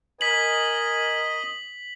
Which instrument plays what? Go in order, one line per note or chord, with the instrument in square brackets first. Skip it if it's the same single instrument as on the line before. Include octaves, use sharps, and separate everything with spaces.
[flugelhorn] A#4 [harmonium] D#5 [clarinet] G#5 [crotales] B6 F#7